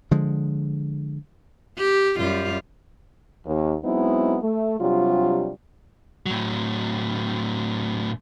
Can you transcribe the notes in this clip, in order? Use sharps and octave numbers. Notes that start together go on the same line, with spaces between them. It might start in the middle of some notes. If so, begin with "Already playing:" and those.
D3 F3 G#3
G4
F#2 G3 F4
D#2
F#3 G#3 B3 C4 D#4 E4
A3
C3 F#3 G3 D4 F4
A2 F#3